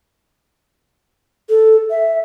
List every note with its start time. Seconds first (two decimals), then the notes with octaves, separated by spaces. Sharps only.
1.49 A4
1.90 E5